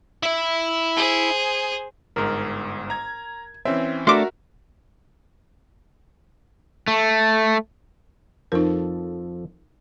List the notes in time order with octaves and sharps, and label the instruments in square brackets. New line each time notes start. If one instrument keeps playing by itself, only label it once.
[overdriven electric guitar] E4 E5
[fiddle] G#4 C5
[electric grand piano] G1 G#2 [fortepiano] A#4
[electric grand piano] A#5 G#6
[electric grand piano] E3 C#4 E5 [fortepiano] C4
[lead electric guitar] A3 D4 [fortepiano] F#4 A#4 [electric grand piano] E5 F6 [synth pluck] C6 D6
[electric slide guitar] A3
[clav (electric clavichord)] F2 F3 A4 [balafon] D#4 A#4